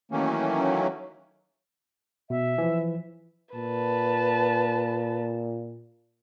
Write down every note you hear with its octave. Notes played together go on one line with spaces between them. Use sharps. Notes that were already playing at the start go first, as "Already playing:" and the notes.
D#3 E3 F#3 A3 A#3 C#4
B2 E5
E3 F3
A#2 B4 A5